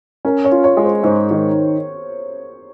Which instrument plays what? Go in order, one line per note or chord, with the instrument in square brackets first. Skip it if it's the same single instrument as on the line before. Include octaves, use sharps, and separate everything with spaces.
[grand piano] C#4 [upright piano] A#4
[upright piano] C#5
[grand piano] F4
[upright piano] C#5
[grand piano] G#3
[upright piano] C5
[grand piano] G#2 [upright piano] C5
[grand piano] D#3